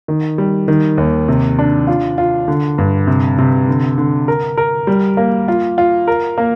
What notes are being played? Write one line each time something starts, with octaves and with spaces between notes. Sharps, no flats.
D#3
G3
D#3
D#2
C3
D4
F4
F4
D3
G2
C3
C3
D3
D3
A#4
A#4
G3
A#3
F4
F4
A#4
A#3